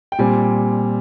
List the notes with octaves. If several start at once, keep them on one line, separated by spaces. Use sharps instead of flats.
G5
A#2 G3 C4 G#5